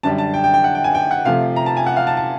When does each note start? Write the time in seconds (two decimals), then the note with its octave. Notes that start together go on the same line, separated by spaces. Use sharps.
0.03 F#2 D3 G3 A5
0.18 A5
0.34 G5
0.44 G5
0.54 G5
0.64 F#5
0.75 G5
0.84 G#5
0.95 G5
1.11 F#5
1.25 C3 F3 A3 F5
1.56 A#5
1.66 A5
1.77 G#5
1.86 F#5
1.96 F5
2.07 A5
2.17 A5